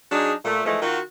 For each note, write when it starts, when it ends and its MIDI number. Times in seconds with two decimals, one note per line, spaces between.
0.12 0.33 54
0.12 0.33 62
0.12 0.33 63
0.12 0.33 68
0.45 0.62 46
0.45 0.62 57
0.65 0.78 52
0.65 0.78 53
0.65 0.78 56
0.65 0.78 57
0.82 0.99 51
0.82 0.99 65
0.82 0.99 66